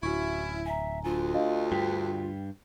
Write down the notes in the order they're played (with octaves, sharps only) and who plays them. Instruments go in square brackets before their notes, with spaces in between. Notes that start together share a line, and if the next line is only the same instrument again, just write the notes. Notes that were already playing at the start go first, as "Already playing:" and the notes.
[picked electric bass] D1 [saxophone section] C#4 E4 [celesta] F#4 C#6
[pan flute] E5 [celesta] G#5 A#5
[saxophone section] D2 [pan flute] F4 [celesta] G#5
[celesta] D4 D#5 F5
[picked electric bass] G2 [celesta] G5 B6